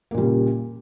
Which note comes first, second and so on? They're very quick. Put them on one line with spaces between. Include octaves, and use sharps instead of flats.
A#3 A#2 G3 C#3